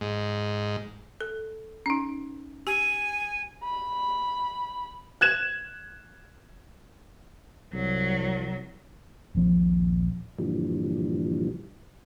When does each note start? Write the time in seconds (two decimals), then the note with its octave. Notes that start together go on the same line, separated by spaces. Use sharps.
0.01 G#2
1.21 A4
1.86 C#4 D#4
2.67 G4 G#5
3.64 B5
5.21 F#6 G#6 E7
7.74 C2 F#3
9.35 D#1 A#1 F3 C4
10.38 G2 A#2 D3 E3 F3 G3